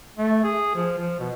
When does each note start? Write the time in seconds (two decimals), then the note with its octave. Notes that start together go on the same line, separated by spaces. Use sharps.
0.18 A3
0.44 G#4
0.75 F3
0.98 F3
1.19 B2